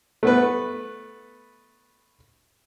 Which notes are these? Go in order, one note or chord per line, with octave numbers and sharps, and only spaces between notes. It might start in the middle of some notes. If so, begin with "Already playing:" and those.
A3 B3 B4